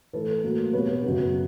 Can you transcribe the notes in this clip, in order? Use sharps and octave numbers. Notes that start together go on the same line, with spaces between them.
A2 E3 A3 A4 B4
A2 F#3 A#3
B2 G3 B3 B4 C#5
F#2 C#3 F#3 B3